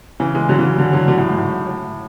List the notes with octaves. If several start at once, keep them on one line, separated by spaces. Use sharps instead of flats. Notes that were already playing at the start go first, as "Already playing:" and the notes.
C#3 E3
E3 G#3
D3 F#3
C#3 E3
D3 F#3
D3 F#3
D3 F#3
A2
G#2
A2
A2